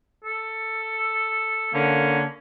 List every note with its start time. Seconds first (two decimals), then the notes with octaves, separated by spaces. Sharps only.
0.25 A4
1.74 D3 A#3 C#4